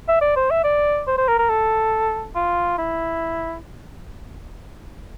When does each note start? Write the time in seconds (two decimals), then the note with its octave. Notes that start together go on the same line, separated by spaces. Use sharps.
0.09 E5
0.22 D5
0.36 C5
0.51 E5
0.64 D5
1.08 C5
1.18 C5
1.28 A#4
1.39 A#4
1.49 A4
2.36 F4
2.78 E4